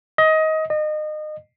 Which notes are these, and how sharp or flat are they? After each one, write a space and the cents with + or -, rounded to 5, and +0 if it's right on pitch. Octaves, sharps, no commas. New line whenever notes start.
D#5 +20
D#5 -30